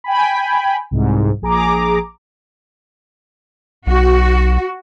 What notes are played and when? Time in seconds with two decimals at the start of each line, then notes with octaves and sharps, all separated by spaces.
0.04 G5 G#5 B5
0.91 C2 G#2
1.42 A#1 G#4 A#5 D6
3.87 B1 F#4